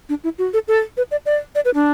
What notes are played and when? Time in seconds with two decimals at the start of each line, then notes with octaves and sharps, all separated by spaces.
0.09 D4
0.24 E4
0.38 F#4
0.53 A4
0.68 A4
0.97 B4
1.11 D5
1.26 D5
1.55 D5
1.65 B4
1.75 D4